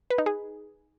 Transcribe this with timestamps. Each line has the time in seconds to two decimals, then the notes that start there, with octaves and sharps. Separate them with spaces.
0.10 B4
0.18 D#4
0.26 G#4